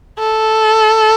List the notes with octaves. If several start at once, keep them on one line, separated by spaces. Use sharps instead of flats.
A4